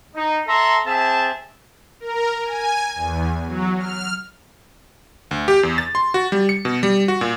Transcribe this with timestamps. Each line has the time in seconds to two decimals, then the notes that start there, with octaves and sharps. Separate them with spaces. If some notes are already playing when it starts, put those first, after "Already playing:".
0.15 D#4
0.47 A4 E5 A#5 C6
0.86 C4 G#4 E5 A5
2.00 A#4
2.45 G#5
2.94 E2
3.46 F#3
3.77 F6
5.31 D2
5.48 G4
5.63 E2
5.78 A6
5.95 C6
6.14 F#4
6.32 G3
6.49 C#7
6.65 B2
6.83 G3
7.08 F#4
7.21 A#2